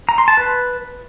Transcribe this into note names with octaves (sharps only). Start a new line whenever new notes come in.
A#5
C6
A5
B4